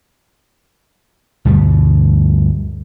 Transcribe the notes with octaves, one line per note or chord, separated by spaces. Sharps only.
D2 G2 B2 G3